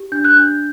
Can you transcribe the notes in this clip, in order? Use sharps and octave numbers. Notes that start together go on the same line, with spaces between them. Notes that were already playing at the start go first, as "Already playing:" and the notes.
Already playing: G4
D4 G6
F#6
D4 G6